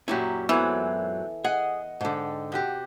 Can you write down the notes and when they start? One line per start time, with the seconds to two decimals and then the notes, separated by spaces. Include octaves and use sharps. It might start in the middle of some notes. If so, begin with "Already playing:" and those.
0.08 F#2 A#2 C#4 E4 G4
0.49 E3 F#3 G#3 B3 C4 E4 A4
1.44 G#4 D#5 F#5
2.01 G#2 D3 D#5 G5 A5
2.52 C3 F#4 G4